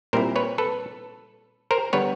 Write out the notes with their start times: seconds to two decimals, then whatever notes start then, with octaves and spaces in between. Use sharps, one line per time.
0.13 A#2 G3 C4 E4 A#4 C5
0.36 B4 C#5
0.58 A4 B4
1.71 A#4 C5
1.93 D3 G3 B3 B4 C#5